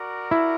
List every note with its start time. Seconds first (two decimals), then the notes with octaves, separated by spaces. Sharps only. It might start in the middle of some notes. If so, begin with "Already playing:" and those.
Already playing: F#4 A#4 D5
0.31 E4